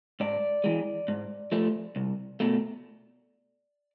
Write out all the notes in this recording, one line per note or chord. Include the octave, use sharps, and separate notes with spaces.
G#2 D5
E3 G#3
G#2
F3 A3
C2
B2 A3